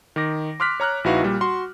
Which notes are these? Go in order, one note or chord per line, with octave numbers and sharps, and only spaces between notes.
D#3 D#4 D6 A#6
C6 D6 F6 F#6 B6
C#5 A#5 F6 F#6
A#1 D#4 E4 F#4 B4 F5
A#2 G3
F#4 C6